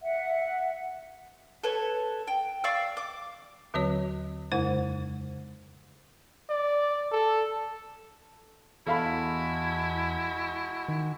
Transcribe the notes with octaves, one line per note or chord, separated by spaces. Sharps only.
E5 F#5
A4 B4 C#5
G5
D5 F5 C#6 E6
D6
D#2 D3 F#3 C4 F#4 C#5
F2 C#3 G#3 E4 C5
D5
A4
E2 G#3 E4 F#4 A4 F5 B5
D#3